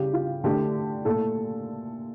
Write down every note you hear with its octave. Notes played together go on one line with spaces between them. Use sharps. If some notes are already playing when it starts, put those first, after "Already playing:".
Already playing: C#3 G3 G4
F4
D3 A3 G4
A#2 A3 A4